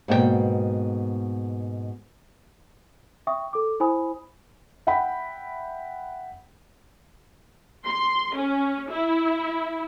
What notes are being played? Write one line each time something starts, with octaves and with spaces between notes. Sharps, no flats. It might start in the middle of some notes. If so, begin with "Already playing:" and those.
G#2 B2 A#3 B3 A4 G5
E5 G5 C#6 D#6
A4 D6
E4 C5 G#5 B5 D#6
E5 F#5 G5 B5
C6
C#4
E4